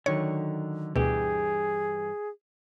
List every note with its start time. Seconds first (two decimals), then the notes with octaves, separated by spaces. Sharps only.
0.06 D3 D#3 F#3 C#5
0.96 D2 G2 B2 E3 G4 G#4